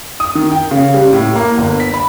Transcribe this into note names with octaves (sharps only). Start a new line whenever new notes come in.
D#6
D#3
G5
C#3
G3
A2
A#3
G1
B6
B5